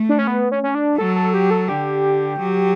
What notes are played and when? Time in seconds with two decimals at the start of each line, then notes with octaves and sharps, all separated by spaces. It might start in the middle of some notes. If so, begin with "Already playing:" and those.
Already playing: A3
0.09 D4
0.19 C#4
0.27 B3
0.51 C#4
0.63 C#4
0.75 D4
0.98 F#3 A4
1.16 A4
1.34 G4
1.51 A4
1.68 D3 G4
2.39 F#3